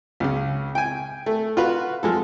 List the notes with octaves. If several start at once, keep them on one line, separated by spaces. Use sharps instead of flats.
C#2 C#3
G5 G#5
A3
F4 F#4 B4
F3 G#3 A4